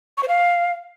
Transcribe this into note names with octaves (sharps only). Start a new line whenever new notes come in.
C#6
C5
F5